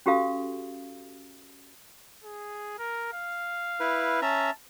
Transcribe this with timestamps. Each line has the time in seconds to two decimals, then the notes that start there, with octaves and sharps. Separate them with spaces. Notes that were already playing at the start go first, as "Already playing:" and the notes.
0.06 C#4 F#4 G4 A4 F5 D#6
2.24 G#4
2.78 A#4
3.13 F5
3.80 E4 B4
4.22 C#4 E5 A5 A#5